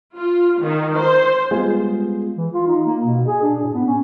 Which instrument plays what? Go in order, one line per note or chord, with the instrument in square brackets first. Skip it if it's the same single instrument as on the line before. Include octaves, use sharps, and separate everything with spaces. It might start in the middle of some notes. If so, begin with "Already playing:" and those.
[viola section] F4
D#3
C5
[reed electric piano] G3 G#3 B3 F4 G#4
[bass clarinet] E3
F4
D#4
A#3
B2
G#4
D4
A2
B3
C#4